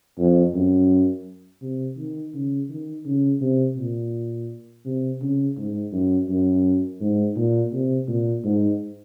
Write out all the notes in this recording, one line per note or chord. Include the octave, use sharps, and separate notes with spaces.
F2
F#2
C3
D#3
C#3
D#3
C#3
C3
A#2
C3
C#3
G#2
F#2
F#2
G#2
A#2
C3
A#2
G#2